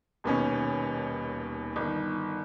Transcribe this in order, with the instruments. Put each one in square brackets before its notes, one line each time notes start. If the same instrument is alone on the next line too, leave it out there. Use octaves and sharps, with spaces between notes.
[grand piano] D#1 D#2 B2 C#4
G1 D#3